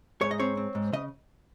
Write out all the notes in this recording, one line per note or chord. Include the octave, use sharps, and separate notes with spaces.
G#2 C#5
D#5
C4 C#5
C4
G#2
C#3 D#5